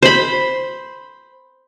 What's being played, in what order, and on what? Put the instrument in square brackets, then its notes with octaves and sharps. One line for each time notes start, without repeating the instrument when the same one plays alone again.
[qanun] C5 B5